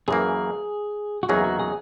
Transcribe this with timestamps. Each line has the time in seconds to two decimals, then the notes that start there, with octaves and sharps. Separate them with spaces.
0.08 F#2 E3 A#3 G#4
1.23 F#4
1.29 E2 C#3 F#3 A#3 D#4 G#4
1.44 F#4
1.59 G#4